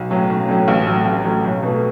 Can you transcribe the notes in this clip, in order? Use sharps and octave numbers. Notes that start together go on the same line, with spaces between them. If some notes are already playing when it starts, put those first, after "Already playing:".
Already playing: B1
A2 F#3 C#4
B1
A2 F#3 C#4
A1
A2 F#3 C#4
A1
A2 F#3 C#4
B1
B2 A3